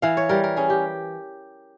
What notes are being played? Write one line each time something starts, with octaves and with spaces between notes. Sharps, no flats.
E3 F5
C#5
G3 A#4
A#4
C#4 G#4
G4